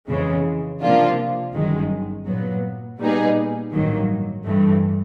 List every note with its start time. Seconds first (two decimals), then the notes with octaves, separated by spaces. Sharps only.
0.09 F2 C#3 E3 G#3
0.81 C3 F3 A#3 D4 F4
1.54 G1 F#2 D#3 G#3
2.27 A#2 F#3 B3
2.99 A#2 G3 B3 D#4 G#4
3.72 A1 G2 D#3 F#3 A#3
4.45 G2 E3 A3